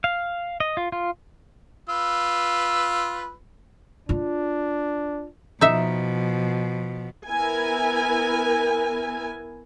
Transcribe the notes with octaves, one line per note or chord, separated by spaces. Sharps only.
F5
D#5
F4
F4
F4 B4 E6
D4 F4
B2 F3 D#4 E5
B3 E4 A#4 G#5